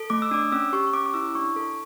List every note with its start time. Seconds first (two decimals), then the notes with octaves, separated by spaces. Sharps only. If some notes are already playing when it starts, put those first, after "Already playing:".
Already playing: A4
0.10 A3 D6
0.22 E6
0.31 D4 D6
0.52 C#4 E6
0.73 G4 C#6
0.87 C#6
0.94 C#4 D6
1.06 D6
1.14 E4 E6
1.35 D4 C#6
1.56 A4